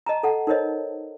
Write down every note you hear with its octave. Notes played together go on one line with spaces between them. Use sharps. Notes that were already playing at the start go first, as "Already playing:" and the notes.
D#5 A5 A#5
A4 F#5 A5
D#4 A#4 C5 C#5 D#5